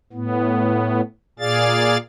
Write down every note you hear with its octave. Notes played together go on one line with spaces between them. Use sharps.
A2 B3
A#2 G#4 D5 F5 A6